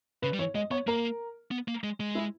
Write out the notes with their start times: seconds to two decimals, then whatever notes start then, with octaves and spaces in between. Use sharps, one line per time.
0.22 C#3 B4
0.34 G3
0.39 E3 C#5
0.55 G#3 D#5
0.71 B3 C#5
0.87 A#3 A#4
1.51 B3
1.68 A#3
1.84 G#3
2.00 G#3
2.15 E4